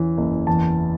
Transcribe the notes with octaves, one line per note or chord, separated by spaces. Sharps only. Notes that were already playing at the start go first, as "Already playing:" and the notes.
Already playing: E2 E3 C#4
F#1
E2 A5